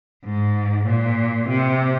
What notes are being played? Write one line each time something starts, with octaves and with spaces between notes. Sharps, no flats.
G#2
A#2
C3